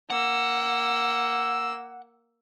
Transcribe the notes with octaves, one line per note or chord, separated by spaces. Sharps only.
A#3 F#5 E6